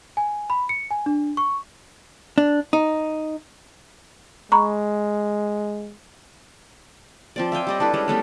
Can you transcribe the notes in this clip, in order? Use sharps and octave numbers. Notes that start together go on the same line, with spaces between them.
G#5
B5
C#7
G#5
D4
C#6
D4
D#4
G#3 A#5 B5 C#6
F3 C4 D5
E5 F5 G5 G#5
G3 D5 D#5
D4 E4 A4 B4
G3 G#3 C#4 D4
G3 A3 B3